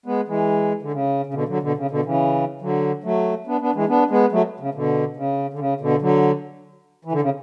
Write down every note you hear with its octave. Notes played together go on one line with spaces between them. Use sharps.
G#3 B3
E3 G#3
D3
C#3
C#3
B2 D3
D3 F#3
B2 D3
C#3
B2 D3
C#3 E3
D3 F#3
F#3 A3
B3 D4
B3 D4
E3 G#3
B3 D4
G#3 B3
F#3 A3
C#3
B2 D3
C#3
D3
C#3
B2 D3
D3 F#3
E3
D3
C#3